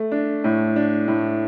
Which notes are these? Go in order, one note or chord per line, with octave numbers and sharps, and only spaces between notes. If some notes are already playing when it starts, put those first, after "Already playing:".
Already playing: A3
D4
A2
D4
A2